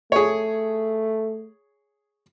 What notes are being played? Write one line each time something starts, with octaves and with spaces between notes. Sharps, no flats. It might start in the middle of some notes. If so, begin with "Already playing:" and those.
A3 G#4 C#5